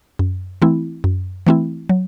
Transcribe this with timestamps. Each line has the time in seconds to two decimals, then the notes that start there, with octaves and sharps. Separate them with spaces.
0.19 F#2
0.62 E3 A3 C4 E4
1.04 F#2
1.47 E3 A3 C4 E4
1.89 F#3